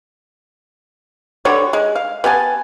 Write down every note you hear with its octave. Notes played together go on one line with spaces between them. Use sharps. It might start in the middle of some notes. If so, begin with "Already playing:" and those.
D3 G3 F#4 C#5
G#3
F5
B3 G4 G#5 A5